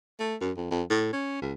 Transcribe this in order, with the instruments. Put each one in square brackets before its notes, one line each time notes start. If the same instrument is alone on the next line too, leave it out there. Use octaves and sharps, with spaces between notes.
[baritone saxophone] A3
F#2
F2
F2
A2
C#4
C#2